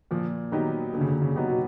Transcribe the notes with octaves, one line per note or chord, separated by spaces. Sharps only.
A#2 F3
D#3 F#3 B3 D#4 G4
A#2 D3
C#3
D3
C#3
F#3 B3 D#4 G4
B2